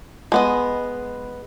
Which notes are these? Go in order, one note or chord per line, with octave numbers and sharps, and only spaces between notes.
G#3 B3 D#5